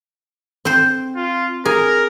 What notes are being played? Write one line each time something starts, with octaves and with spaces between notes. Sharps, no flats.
C4 C5
F4
G#4 A#4